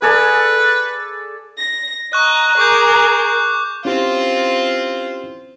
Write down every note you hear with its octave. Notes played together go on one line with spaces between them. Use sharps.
G#4 A4 B4 D5
A#6
D#5 A#5 C#6 F#6
G#4 A#4 C#6 D6 G6
C4 C#4 E4 F4 G4